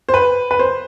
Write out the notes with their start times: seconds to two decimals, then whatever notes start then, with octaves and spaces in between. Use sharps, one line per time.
0.09 C5
0.14 B4
0.51 B4
0.59 C5